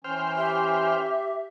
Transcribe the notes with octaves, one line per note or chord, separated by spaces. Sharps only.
E3 C#4 C5 G5 F6
G4 E5